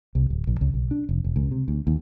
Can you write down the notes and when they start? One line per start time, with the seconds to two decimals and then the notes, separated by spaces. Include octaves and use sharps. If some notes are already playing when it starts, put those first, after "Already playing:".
0.15 C2
0.30 D1
0.47 A#1
0.61 C#2
0.74 B1
0.91 D4
1.09 F1
1.24 E1
1.36 C#2
1.51 C3
1.68 D2
1.87 D#2